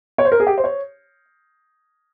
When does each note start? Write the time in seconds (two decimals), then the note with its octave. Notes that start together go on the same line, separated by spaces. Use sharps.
0.18 C#5
0.25 C5
0.32 A#4
0.40 G#4
0.47 G4
0.58 C5
0.64 C#5